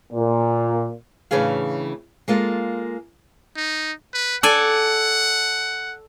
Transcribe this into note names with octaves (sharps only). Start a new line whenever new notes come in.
A#2
A2 C#3 E3 D4 G#4 F5
G#3 A#3 F4 A4
D#4
B4
A4 D5 F#5 G#5